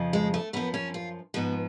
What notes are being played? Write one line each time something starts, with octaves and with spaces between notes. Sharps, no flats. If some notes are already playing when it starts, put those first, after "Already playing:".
Already playing: F2 C#3 F3
G#3
A3
F#2 F3 B3
C#4
F4
G#2 F3 B3